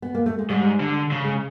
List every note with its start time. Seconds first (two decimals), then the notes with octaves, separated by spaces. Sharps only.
0.02 B3
0.15 A#3
0.26 A3
0.39 G#3
0.50 G#2 G3
0.80 D3
1.11 C#3 A3
1.24 G#3